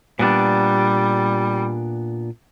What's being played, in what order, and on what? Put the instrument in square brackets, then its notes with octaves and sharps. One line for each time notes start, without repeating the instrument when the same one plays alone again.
[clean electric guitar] A#2 B3 D4 [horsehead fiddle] G3